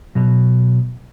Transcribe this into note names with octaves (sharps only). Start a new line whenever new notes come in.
B2 F#3